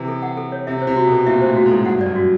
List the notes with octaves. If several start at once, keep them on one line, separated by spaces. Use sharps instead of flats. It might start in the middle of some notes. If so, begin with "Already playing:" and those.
Already playing: C3 E3
A4
F#5
A4
C#5
C3 E5
C5
C3
F#4
B2 A4
A#2 E5
A2 C5
F#4
G#2 A4
G2 F#5
D5
F#2
F#4